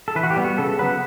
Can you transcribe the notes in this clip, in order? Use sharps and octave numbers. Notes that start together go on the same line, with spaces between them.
A4
E3 B4
F#4
G4
G3 B3
F#4
C#3 A4
F#3 B3 B4